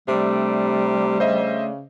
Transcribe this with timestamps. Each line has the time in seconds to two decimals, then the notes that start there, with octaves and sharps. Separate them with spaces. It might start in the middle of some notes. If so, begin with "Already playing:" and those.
0.08 C3 G3 A3 D4
1.20 C#3 C5 D#5 E5